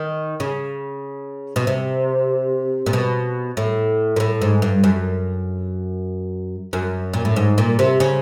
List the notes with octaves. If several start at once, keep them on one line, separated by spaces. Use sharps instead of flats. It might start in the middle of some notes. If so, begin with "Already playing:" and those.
Already playing: D#3
C#3
B2
C3
A#2
B2
A2
A#2
A2
G#2
G2
F#2
F#2
A#2
A2
G#2
A#2
C3
C#3